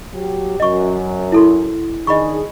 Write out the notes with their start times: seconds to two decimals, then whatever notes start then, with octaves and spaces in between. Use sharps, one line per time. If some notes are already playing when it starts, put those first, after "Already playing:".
0.14 F#3 G4
0.60 F#2 D#5 C#6
1.32 E4 A4 C6
2.07 D#3 D4 G#4 D#5 B5 C#6